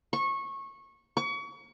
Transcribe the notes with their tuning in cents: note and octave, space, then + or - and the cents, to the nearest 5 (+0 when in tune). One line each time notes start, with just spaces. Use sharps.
C#6 -20
C#6 +35